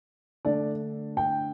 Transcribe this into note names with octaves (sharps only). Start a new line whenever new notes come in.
D3 A3 D4 D5
G5